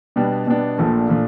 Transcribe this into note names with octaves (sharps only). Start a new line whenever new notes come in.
B2 G3 B3 D4
B2 G3 B3 D4
A#1 A#2 F3 A3 D4
A#2 F3 A3 D4